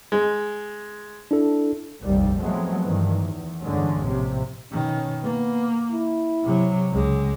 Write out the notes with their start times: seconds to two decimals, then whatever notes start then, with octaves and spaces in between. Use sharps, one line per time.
0.12 G#3
1.31 D4 E4 A4
2.04 F1 A#1 D#2 G3
2.41 F3 F#3 G#3 A3 B3 C4
2.84 G2 D#3 E3 F#3
3.24 E2
3.62 E2 G2 D3 G#3 C#4
4.02 A#1 A2 C3
4.72 B2 D#3 C#4
5.23 A#3 B3
5.92 E4
6.43 C3 F#3
6.92 C#2 G#3